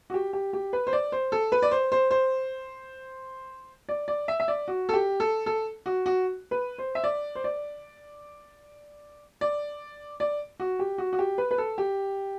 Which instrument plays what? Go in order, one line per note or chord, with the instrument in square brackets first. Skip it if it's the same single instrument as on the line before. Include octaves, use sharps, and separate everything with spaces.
[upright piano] F#4
G4
G4
G4
B4
C5
D5
C5
A4
B4
D5
C5
C5
C5
D5
D5
E5
E5
D5
F#4
A4
G4
A4
A4
F#4
F#4
B4
C5
E5
D5
C5
D5
D5
D5
F#4
G4
F#4
F#4
G4
B4
B4
A4
G4